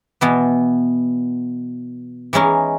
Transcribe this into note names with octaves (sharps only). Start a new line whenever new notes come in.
B2 E3 B3
E3 G#3 C#4 D#4